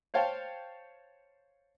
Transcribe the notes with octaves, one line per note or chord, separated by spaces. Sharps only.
C5 C#5 F5 G5 A5